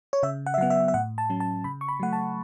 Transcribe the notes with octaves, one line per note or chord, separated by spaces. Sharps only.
C#5
C#3 E5
F#5
E5
F#3 B3 F#5
E5
E5
A2 F#5
A5
F#3 C#4
A5
C#3 B5
C#6
B5
F#3 A3 F#5
A5